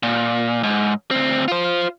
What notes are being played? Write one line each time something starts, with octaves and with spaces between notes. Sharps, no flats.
A#2
G#2
D2 C4
F4 C5